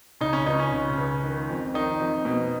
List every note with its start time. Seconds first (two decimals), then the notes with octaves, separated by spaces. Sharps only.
0.21 C#3 D#4
0.33 C#4
0.46 C#2 D#4
0.59 C#4
0.72 C#3
0.97 C#2
1.23 D#3
1.49 F2
1.74 D#3 D#4
2.00 F2
2.25 B2